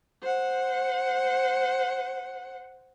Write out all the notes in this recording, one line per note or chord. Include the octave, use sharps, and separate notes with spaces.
C5 F#5